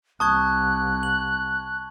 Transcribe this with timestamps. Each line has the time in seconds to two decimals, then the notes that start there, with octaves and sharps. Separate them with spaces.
0.20 C2 A5 C#6 D#6 F#6 G#6
1.03 F#7